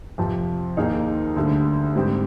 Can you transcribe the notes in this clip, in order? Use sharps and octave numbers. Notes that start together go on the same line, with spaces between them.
F2 C3 F3
D#2 D#3 A#3 D#4 G#4
D2 D3 G3
G#2 G3 C4 G4